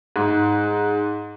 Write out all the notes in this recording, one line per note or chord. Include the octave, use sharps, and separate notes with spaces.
G#2